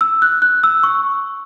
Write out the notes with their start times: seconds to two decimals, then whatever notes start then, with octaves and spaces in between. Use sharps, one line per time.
0.01 E6
0.22 F#6
0.42 F#6
0.64 E6
0.83 C#6